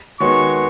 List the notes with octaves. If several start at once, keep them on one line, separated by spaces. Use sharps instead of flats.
D#3 G#3 B3 F#4 C#5 C#6